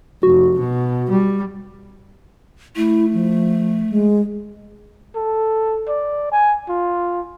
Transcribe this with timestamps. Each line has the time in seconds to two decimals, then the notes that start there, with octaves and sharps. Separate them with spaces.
0.23 F1 F#4
0.59 B2
1.10 G3
2.76 A3 E4
3.13 F3
3.90 G#3
5.15 A4
5.88 D5
6.32 G#5
6.69 F4